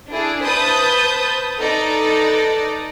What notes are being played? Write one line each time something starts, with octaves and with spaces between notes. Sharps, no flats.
D4 E4 G#4
B4 C5 A5 B5 D#6 G6
D#4 A4 B4 D5